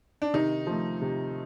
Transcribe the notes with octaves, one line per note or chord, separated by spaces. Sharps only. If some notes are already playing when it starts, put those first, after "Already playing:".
D4
C3 D#3 D#4
F3 A3
C3